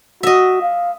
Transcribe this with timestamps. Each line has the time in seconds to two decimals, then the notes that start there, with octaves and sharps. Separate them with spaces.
0.23 F#4 D#5 E5
0.62 F5